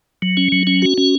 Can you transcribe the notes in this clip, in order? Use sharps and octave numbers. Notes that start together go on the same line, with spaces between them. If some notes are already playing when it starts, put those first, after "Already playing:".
F#3
C#4
F#3
C#4
F#4
C#4